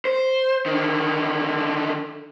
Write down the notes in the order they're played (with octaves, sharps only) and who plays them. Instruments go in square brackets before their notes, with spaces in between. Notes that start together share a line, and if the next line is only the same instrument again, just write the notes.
[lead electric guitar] C5
D3 D#3